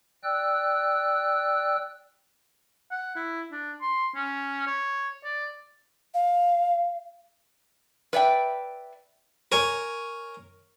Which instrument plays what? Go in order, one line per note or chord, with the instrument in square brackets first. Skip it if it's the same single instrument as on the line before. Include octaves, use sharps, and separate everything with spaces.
[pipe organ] D5 G5 E6 F#6
[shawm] F#5
E4
D4
C6
C#4
C#5
D5
[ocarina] F5
[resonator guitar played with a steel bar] B4 D5 E5 G5
[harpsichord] A#4 C#5 G#5